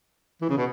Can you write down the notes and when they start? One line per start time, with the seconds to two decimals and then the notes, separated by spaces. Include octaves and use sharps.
0.41 E3
0.49 C#3
0.57 B2